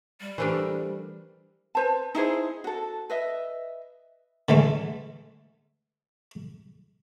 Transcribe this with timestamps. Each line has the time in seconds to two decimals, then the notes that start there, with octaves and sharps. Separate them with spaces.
0.21 G3
0.38 E3 A3 D4 G4 A#4 C5
1.75 B4 C5 A5
2.15 D#4 E4 G#4 C5
2.64 F#4 A4
3.10 B4 D#5 E5
4.49 D3 E3 G#3 A3